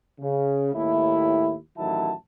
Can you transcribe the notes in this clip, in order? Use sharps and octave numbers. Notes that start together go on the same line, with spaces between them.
C#3
D#2 A2 E4
A1 D#3 F#3 E4 A5